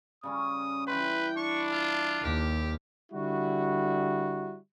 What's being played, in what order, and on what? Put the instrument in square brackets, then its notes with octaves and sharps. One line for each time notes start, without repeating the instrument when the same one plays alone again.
[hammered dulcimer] C#3 G3 C#4 [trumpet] D#6
[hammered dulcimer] E3 E4 C6 [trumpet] B4 [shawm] G5
[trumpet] D4 [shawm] C#6
[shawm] F4 [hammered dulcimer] A5
[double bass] D#2 [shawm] G4 [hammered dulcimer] F5
[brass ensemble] D3 G3 E4 F#4